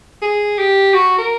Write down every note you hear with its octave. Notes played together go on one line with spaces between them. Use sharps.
G#4
G4
F#4
A#4